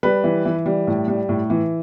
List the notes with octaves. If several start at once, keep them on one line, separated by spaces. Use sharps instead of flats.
G3 B4
E3
E3
G3
A2
G3
A2
E3